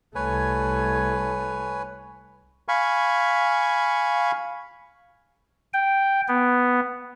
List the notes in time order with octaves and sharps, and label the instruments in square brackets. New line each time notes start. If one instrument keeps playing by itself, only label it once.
[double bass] C2 A3 [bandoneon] B4 C#5 G#5
[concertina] F5 G#5 B5 C#6
[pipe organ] G5
B3